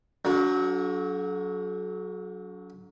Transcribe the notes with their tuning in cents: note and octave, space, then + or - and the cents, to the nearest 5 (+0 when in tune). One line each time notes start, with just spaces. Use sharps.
D3 -40 F#3 +0